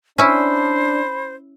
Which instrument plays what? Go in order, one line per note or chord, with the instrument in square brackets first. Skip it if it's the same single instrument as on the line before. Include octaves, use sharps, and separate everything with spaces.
[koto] C#4 E4 [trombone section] D4 [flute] C5 [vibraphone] B5